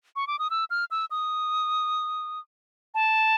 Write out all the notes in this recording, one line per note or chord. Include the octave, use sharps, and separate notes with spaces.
C#6
D6
D#6
E6
F6
E6
D#6
A5